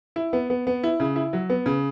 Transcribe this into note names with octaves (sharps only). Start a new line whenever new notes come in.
E4
B3
B3
B3
E4
C#3
E4
F#3
B3
C#3